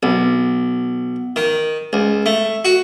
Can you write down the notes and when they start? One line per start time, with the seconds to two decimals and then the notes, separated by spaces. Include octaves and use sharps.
0.03 B1
1.36 D#3
1.93 C#2
2.26 A3
2.65 F#4